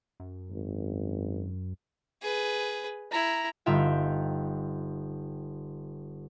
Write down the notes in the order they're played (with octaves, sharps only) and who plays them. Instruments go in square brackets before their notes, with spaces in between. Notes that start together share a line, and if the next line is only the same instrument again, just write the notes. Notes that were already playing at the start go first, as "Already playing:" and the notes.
[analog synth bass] F#2
[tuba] G#1
[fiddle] G#4 B4
[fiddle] E4 [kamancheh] A#5
[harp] G1 D#4 F4 E5 G5